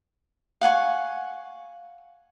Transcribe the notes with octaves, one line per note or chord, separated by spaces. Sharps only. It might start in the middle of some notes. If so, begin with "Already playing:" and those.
F5 F#5 G#5 C#6